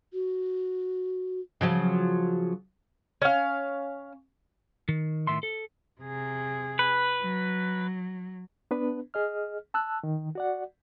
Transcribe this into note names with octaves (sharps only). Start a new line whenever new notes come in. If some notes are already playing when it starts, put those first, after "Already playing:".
F#4
C#3 F3 F#3
C#4 F5
D#3
A2 D#3 E5 C6
A4
C3 G#4
B4
F#3
B3 D4 B4
G#4 D#5 F6
A5 E6 F#6
D#3
F#4 D5 F#5